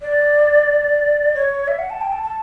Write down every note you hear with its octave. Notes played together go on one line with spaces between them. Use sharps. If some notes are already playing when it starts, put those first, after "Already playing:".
D5
C#5
E5
F#5
A5
G5
A5
A5